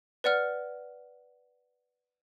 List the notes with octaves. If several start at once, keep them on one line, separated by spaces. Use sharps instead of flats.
B4 D5 F#5 F6